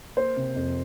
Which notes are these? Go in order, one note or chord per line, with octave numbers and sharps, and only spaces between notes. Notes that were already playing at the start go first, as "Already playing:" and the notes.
A#3 C5
C3
F2